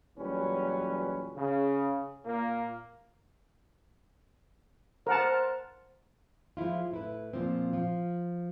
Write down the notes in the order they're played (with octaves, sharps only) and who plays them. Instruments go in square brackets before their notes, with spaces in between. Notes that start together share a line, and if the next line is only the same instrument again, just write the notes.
[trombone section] E2 A#2 F#3 G3 C#4 B4
C#3
A#2 A#3
[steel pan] A#4 F#5 A5 [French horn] C5
[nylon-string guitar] F3 G#3 E4 F4
A2 E4 B4
A#2 F3 C4
F3 F4